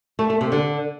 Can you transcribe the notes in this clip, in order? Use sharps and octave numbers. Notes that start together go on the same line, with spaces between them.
A3
A3
C3
D3